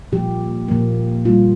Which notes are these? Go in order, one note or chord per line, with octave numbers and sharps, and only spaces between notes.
A#2 F3 A#3 G4
A#2 F3 A#3
A#2 G3 A#3 F4